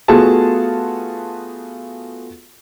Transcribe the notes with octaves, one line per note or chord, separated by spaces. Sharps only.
A3 B3 F4 F#4 G#4 A5